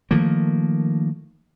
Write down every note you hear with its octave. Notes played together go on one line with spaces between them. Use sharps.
D#3 F3 A3 A#3